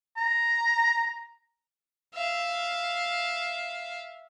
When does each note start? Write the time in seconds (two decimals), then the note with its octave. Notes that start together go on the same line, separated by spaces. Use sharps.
0.17 A#5
2.14 E5 F5